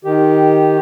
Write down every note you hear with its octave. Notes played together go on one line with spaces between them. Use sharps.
D#3 G4